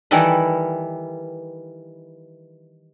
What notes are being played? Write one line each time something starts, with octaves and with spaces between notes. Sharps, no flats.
D#3 E3 G3 E4 A4 B4